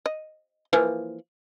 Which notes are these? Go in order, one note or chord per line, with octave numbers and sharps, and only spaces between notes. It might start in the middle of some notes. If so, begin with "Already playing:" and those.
D#5
E3 F3 A#3